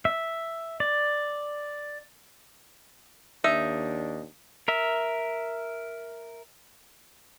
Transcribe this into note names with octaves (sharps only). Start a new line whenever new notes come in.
E5
D5
D#2 D4 D#4 E5
A#4 E5